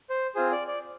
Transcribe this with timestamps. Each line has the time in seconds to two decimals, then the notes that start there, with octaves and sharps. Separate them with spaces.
0.10 C5
0.35 C4 F4 G#4 C5
0.52 D5
0.67 D5